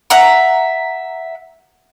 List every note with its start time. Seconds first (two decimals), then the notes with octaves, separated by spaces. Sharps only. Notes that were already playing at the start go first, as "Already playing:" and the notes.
0.10 E5 F#5 A#5